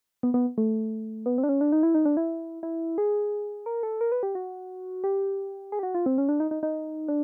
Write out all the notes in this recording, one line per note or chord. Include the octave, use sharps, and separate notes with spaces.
B3
B3
A3
B3
C4
D4
C#4
D4
D#4
E4
D#4
D4
E4
E4
G#4
A#4
A4
A#4
B4
G4
F#4
G4
G#4
G4
F#4
F4
C4
C#4
D4
D#4
D#4
D#4
D4